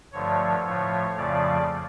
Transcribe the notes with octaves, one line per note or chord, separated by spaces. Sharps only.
G2 D3 F3 A3 C#5
A2 F3 A3 C#5
F2 C#3 F3 A3 D5